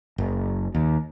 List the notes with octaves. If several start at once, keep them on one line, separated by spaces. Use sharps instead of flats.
F#1
D#2